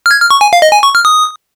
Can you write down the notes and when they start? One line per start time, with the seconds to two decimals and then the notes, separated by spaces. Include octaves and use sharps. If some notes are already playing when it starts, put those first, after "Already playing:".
0.06 F6
0.11 G#6
0.20 F6
0.31 C#6
0.41 G#5
0.53 F5
0.62 D#5
0.72 G#5
0.83 C#6
0.95 F6
1.05 D#6